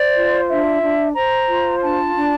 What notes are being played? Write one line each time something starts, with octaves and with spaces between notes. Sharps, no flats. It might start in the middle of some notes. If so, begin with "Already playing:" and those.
Already playing: C5 D5
F4
D4 E5
D4
C5 A#5
F4
D4 A5
D4